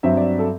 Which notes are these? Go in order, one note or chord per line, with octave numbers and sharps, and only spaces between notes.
G2 F#3 C4 E5
D5
A4